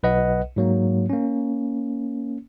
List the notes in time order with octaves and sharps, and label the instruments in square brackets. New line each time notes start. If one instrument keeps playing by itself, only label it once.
[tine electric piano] B1 B4 D#5 F#5
G#2 F#3 A#3
A#3 C#4